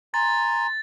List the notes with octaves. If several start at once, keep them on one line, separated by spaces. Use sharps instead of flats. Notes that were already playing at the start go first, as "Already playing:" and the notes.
G#5 A#5 C6 A6